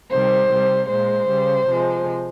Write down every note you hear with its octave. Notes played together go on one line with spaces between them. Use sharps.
C3 D#3 G3 C5
C3 G3
A#2 G#3 C5
C#3 G3
C3 F3 G#3